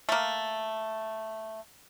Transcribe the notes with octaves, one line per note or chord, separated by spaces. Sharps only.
A3 A#3